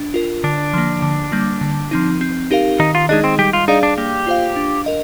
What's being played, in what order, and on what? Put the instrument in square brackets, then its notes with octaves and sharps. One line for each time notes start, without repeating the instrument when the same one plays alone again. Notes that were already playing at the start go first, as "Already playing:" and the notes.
Already playing: [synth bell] D4
F4 A#4
[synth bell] D3 [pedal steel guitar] D4
[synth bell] F3 A#3
D3
G3 A#3
D3
F3 C4 D#4
C4
D#4 G4 A#4 F5
[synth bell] D#3 [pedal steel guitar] D#4
[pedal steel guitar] F4
[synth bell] G#3 D#4 G#4 D#5 [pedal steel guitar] D4
[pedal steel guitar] C4
[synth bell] G3 [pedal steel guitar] G4
[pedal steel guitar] F4
[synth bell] D4 G#4 D5 F5 [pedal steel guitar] D#4
[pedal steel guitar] D4
[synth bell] A#3 [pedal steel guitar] G4
[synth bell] F4 C5 F5
D4
A#4 D#5